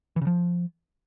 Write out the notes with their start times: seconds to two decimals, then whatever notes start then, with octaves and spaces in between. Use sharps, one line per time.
0.16 E3
0.21 C#3
0.27 F3